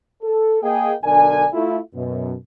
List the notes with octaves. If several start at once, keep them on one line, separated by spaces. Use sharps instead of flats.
A4
A#3 G#4 D#5 G5
B1 D3 D4 A#4 D5 G#5
A3 E4 F4
F#2 B2